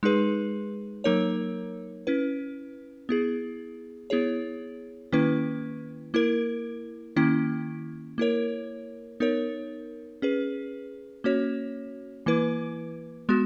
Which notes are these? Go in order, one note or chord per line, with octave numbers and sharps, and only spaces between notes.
G#3 D#4 G#4 B4
F#3 A#3 D#4 A#4 C#5
C#4 E4 B4
B3 E4 G#4
B3 E4 G#4 C#5
D#3 A#3 C#4 E4 B4
A#3 E4 A#4
D#3 A#3 C#4 E4
A#3 E4 A#4 C#5
B3 D#4 A#4 C#5
C#4 G#4 B4
A#3 C#4 F#4 C#5
E3 A#3 E4 B4
G#3 B3 F#4